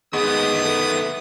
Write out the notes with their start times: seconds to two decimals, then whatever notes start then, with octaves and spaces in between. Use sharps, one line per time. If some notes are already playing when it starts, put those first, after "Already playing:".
0.13 D#3 G#3 B3 E4 D#6
0.63 A3